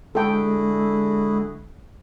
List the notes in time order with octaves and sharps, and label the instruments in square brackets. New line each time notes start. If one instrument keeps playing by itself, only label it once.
[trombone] D3 [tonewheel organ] G#3 [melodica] E4 F#4 G#4 [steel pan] A4 G5